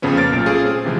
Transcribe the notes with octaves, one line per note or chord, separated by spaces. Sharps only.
F2 C#3 F3 B3 C#4
A#3 F6 A6 D7
B1 A#2
A3 C#4 F4 G#4
C4 G#4
C3 E3 F3 G#3